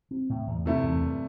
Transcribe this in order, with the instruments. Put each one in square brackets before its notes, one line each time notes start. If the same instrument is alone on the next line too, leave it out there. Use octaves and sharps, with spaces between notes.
[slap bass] C4
A2
E2
[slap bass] G2 [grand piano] C3 A3 E4
[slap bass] E2
G2